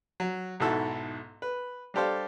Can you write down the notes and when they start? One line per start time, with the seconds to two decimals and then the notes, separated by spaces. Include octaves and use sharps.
0.20 F#3
0.60 B1 G#2 E4 F#4 A4 E6
1.42 B4
1.94 G3 D4 G4 A4 C5 F5